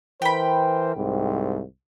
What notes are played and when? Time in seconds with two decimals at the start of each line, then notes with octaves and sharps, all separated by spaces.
0.22 E3 A#4 C5 G5 B5
0.96 C2 G#2